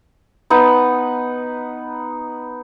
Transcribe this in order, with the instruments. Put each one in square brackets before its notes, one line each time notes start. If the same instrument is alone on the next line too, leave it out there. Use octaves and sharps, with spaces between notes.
[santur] B3 D#4 B4